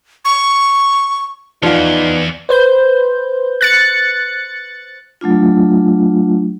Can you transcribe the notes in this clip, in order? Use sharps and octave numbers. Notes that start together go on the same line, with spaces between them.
C#6
E2 F3 B3 D#4 F4 D5
B4 C5 G6
F#6 A6 C#7
F#3 A3 D4 F4